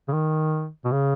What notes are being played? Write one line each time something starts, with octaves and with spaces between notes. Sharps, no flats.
C#3
D#3
B2
C#3